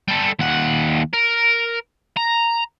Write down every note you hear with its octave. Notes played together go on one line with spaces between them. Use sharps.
G3 A4
D#2 F#5
A#4
A#5